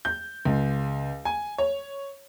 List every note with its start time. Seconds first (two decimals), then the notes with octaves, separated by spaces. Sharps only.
0.05 G6
0.45 C#2
1.25 G#5
1.58 C#5